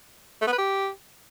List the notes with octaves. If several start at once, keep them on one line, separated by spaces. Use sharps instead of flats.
A3
B3
B4
G4